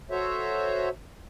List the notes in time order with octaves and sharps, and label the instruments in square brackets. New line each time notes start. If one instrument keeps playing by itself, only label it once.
[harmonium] F#4 A4 C5 C#5 E5